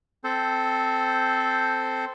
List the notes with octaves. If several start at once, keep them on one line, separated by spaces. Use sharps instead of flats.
C4 A4 C5